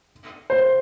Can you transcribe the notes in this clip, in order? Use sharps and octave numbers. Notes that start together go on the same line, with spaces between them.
C5